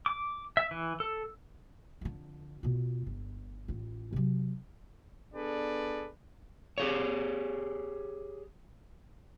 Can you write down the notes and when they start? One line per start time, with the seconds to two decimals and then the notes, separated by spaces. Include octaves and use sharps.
0.06 D6
0.57 E5
0.71 E3
1.00 A4
2.01 F2 D3
2.63 B2 F4
3.06 G1
3.68 A1 F4
4.13 C3 F#3
5.34 B3 D4 G#4 A4 B4 D5
6.78 G4 G#4 C#5